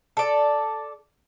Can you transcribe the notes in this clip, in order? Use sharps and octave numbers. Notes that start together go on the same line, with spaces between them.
A4 D5